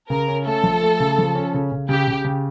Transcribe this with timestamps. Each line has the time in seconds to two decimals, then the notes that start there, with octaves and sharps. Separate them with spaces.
0.10 C#3 A#4
0.28 C#4
0.46 A3 A4
0.64 F3
0.82 A3
1.00 C#3
1.18 F3
1.35 C#4
1.54 C#3
1.72 C#3
1.89 C#3 G4
2.08 C#3
2.25 C#3